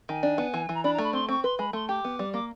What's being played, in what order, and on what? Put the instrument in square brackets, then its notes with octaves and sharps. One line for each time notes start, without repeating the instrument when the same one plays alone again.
[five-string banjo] D#3 [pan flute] G#5
[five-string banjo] D4
B3
E3
E3
[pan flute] A#5
[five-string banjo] D4 [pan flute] B5
[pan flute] A#5
[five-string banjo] A3
[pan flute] B5
[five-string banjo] C4 [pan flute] C6
[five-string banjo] C4 [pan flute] C#6
[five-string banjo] B4 [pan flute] C6
[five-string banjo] G#3 [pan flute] B5
[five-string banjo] A3 [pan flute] C6
[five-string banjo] G4 [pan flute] D6
[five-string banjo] B3
G3
[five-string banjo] A#3 [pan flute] D6